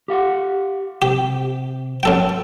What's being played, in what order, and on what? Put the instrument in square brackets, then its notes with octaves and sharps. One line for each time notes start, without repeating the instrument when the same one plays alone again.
[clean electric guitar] G4 F5 F#5
[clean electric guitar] C3 [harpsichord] G4
[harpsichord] F#2 A4 G5